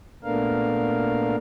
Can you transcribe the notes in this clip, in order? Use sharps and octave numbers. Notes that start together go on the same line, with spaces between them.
A#2 A3 B3 D4 A#4 F5